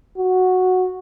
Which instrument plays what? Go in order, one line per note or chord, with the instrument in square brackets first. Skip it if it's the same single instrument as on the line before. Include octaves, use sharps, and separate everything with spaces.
[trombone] F#4